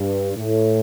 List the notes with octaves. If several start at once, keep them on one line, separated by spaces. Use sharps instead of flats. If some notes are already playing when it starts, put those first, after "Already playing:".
Already playing: G2
A2